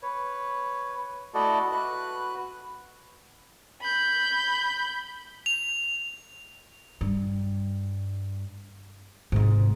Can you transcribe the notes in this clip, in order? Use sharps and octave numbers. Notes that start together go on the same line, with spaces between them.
B4 C#5
A3 E4 F#4 A4 D5 D#5
F#4 B4 F#6
B5 G6
F7
G2
G#2 C3